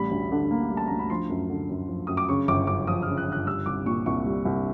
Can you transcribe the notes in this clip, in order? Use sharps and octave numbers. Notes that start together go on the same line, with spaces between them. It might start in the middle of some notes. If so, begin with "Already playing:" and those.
Already playing: A1 G3 B5
D2
D3
A#3
G3
A5
D2 A#5
B5
F3 C6
F#2
D3
F#2
F3
F#2 D#6
D6
C#3 C#6
G1 D6
F#2 D6
F3 D#6
C#3 F6
F#6
G1 F#6
G3 E6
C2 D6
A#2 C#6
C2 C#6
G3
C2